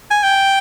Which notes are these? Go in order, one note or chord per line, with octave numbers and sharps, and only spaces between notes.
G#5
G5